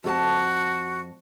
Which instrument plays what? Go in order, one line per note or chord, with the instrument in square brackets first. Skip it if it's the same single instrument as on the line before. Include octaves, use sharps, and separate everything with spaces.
[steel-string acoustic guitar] F2 A4 A5 [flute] F#4